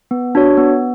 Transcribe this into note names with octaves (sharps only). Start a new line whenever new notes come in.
B3
D4 F#4 C#5
B3